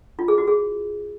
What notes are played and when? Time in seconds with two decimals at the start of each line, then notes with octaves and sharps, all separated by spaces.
0.19 F4
0.28 G#4
0.38 F#4
0.48 G#4